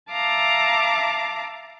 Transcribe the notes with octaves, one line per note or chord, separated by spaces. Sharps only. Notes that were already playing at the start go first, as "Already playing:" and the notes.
E5 F5 A5 A#5 D6